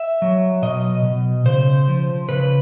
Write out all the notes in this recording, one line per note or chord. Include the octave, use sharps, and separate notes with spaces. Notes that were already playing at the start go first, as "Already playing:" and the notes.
Already playing: E5
F#3
B2 D#5
B2
C#3 C5
F3
C#3 B4